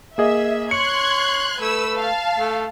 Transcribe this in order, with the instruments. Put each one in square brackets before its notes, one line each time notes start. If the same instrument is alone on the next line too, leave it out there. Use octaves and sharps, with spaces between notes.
[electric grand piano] A#3 G#4 D#5 [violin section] E5
[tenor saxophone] C#5 [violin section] C6 F#6 G#6 [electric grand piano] C#7
[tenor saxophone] A3 [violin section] B4 E6
[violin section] F5 A5
[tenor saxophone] A3